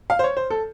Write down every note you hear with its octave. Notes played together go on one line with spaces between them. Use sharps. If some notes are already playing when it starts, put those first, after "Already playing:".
F5
C5
C#5
C5
A4